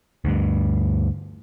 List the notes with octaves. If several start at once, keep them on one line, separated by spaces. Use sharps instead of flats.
D2 G2